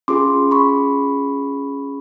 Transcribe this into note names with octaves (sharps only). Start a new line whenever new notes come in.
C#4 F4 G#4 C6 D6
B5 C#6